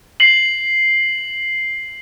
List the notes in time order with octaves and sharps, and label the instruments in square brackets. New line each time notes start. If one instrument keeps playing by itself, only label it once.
[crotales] C7 F#7